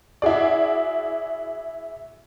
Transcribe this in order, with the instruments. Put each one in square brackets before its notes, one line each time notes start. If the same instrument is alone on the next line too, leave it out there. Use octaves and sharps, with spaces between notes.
[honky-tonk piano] E4 F#4 G#4 D5